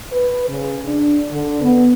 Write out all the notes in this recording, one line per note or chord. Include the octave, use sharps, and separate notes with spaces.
B4
C#3
D4
D3
B3